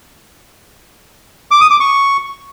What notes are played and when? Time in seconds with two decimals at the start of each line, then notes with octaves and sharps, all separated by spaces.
1.51 D6
1.61 D#6
1.71 D6
1.80 C#6